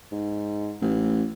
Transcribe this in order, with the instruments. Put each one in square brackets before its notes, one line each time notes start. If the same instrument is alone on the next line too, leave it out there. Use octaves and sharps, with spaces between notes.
[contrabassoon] G#2
A1